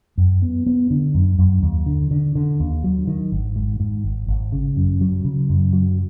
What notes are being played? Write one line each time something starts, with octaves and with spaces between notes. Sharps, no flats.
F#2
B3
B3
D3
F#2
F#2
D#2
D3
D3
D3
D#2
F#3
D#3
G#1
G#2
G#2
G#1
G#1
C#3
F#2
F#3
C#3
F#2
F#3